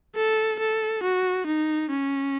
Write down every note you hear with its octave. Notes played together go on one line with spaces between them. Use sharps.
A4
A4
F#4
D#4
C#4